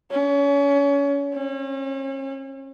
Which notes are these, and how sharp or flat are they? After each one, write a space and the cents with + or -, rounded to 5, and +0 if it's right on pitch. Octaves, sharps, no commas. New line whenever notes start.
C#4 +30
C#4 -40